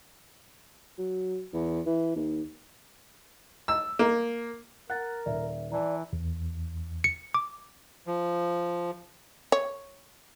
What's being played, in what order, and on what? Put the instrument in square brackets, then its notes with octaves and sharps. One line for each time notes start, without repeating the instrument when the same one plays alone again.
[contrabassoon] F#3
E2
E3
D#2
[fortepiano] E6
A#3
[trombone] A#4 [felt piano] F#5 [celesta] F#6 A6
[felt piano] D#1 [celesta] D5 E5
[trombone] E3 [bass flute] D5 [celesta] A5 A#5
[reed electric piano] E2
[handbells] C#7
D6
[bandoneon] F3
[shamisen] C#5